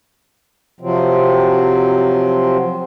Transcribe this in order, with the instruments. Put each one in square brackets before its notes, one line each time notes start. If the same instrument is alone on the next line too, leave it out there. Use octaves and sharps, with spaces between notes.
[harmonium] C3 F3 F#3 C4